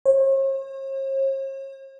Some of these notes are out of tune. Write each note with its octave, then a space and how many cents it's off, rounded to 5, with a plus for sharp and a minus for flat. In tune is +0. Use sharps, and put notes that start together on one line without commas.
C#5 -45